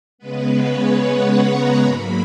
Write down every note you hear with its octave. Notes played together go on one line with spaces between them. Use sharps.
C#3 G#3 B3 B4
C#5
F#5
A#5
G#2 F#3 A#3 B5